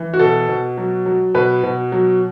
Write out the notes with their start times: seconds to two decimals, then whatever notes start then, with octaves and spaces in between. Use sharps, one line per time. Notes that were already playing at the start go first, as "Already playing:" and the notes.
Already playing: E3
0.14 F#4
0.19 B2 A4
0.49 B2
0.78 F#3
1.06 F#3
1.35 B2 B4
1.64 B2
1.92 F#3